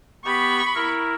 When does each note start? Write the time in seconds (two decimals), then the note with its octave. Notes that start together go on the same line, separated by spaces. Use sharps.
0.25 B3 G4 B5 C#6
0.75 E4 A#4